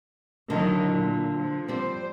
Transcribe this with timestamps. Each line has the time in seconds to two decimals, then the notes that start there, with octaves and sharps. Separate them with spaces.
0.50 D3 D#3 F#3 E4
0.91 A#2
1.34 F3
1.68 G3 C4 C5